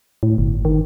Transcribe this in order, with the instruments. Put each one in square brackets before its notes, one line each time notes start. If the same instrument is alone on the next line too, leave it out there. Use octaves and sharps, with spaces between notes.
[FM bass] A2
G1
D#3